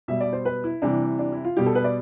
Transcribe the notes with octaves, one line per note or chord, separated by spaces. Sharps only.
B2 G3 E5
D5
C5
B4
E4
C3 E3 G3 D4
D4
E4
F4
B2 G3 G4
A4
B4
D5